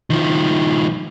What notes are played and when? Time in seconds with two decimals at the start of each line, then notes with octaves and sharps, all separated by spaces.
0.10 D#3 F3